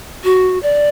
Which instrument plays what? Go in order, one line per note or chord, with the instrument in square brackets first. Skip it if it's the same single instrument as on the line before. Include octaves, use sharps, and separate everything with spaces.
[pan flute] F#4
D5